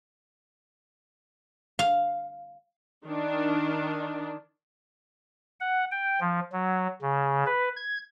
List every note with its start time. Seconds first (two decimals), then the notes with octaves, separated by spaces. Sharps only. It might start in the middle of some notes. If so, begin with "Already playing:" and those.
1.79 F5
3.05 D#3 D4
5.60 F#5
5.92 G5
6.21 F3
6.52 F#3
7.02 C#3
7.46 B4
7.76 G#6